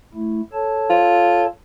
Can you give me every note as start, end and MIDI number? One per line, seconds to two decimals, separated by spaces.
0.14 0.41 57
0.14 0.41 64
0.53 1.47 69
0.53 1.47 73
0.53 1.47 81
0.90 1.46 65